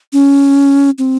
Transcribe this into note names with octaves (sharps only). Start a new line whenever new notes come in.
C#4
C4